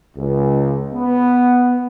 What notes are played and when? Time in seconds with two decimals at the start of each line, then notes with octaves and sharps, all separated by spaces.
0.16 C#2
0.94 B3